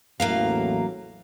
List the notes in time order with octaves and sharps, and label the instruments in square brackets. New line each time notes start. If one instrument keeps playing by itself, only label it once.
[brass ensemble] A1 E2 A2 [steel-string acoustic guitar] F#3 A#3 F5